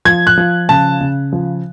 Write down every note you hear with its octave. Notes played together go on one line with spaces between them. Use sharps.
F3 G#6
F#6
F3
C#3 A5
C#3
F3